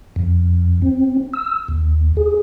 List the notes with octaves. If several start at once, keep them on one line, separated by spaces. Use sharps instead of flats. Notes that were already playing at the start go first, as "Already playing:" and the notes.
F2
C4
E6
D#2
G#4